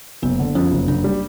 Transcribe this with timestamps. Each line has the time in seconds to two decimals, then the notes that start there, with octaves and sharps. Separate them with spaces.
0.22 F#1 B3
0.39 D3
0.55 F2 C#4
0.71 F#1
0.87 F#1 D4
1.04 G3